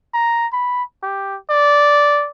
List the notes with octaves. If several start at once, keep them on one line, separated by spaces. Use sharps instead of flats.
A#5
B5
G4
D5